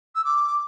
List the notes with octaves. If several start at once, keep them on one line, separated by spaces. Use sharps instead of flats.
E6
D6